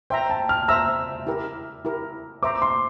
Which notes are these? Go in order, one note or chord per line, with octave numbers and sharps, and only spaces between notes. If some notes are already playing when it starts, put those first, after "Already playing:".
C5 E5 G5 A#5
A5
F6
C5 E5 A#5 E6
E4 G4 A#4
E4 G4 A#4
C5 E5 A#5 D6
C6